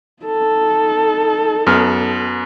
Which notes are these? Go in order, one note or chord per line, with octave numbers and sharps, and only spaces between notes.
D#4 A4
F#2 B3 F6